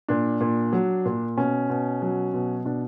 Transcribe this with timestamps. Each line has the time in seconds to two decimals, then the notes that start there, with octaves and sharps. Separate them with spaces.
0.08 A#2 D4
0.41 A#2
0.73 F#3
1.05 A#2
1.37 B2 C#4
1.69 B2
2.02 F#3
2.34 B2
2.65 B2 D4